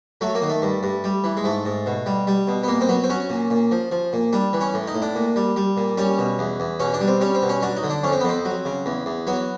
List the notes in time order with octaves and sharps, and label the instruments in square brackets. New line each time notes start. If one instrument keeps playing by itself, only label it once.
[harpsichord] F#3 A3
A#3
D#3
A3
G2
G2
G3
E3
G#3
G#2 A3
G#2
B2
G3
G3
B2
B3
A#2 A#3
C4
F#3 B3
C4
F#3 C#4
A#2
A#2
F3
F3
A#2
G3 D4
E3
C#4
A2
D#4
A2
D4
A#2
G3
G3
A#2
G3 C#4
B2
E2
E2
B2 C#4
D4
G3
C4
G3 C#4
C4
B2
C#4
F#3 D4
D#4
D3
D4
F2 C#4
C4
B3
F2 C4
F#3
C#3
E2
E2
F#3 B3